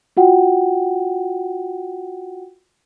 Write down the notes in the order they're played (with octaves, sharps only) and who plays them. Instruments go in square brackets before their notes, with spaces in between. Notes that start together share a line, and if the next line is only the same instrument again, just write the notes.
[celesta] F4 F#4 F#5 G5